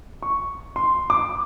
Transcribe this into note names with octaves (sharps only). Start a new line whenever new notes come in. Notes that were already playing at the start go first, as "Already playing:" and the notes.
C#6
C6
D6